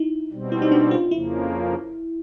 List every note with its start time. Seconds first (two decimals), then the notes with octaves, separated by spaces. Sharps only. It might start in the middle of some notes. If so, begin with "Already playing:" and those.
Already playing: D#4 E4
0.32 B2 G3 C4
0.52 E4
0.62 D#4
0.72 D4
0.91 F4
1.11 F2 C#3 F3 A#3 E4